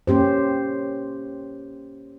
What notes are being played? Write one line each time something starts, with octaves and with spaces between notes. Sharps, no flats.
A#3 C#4 G4 C5